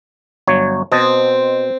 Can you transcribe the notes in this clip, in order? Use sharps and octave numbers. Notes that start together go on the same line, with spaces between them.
G1 F#3 C#5
B2 C4 D#5 A5